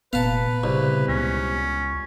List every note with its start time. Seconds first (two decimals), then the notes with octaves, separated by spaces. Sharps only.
0.13 F1 A#2 B3 B4 F5 A5
0.64 C2 C#3
1.08 C#2 C#4